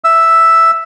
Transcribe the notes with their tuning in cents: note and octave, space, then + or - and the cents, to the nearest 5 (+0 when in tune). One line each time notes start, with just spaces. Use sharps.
E5 +0 E6 +0